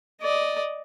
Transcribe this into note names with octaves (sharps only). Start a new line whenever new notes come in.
D5 D#5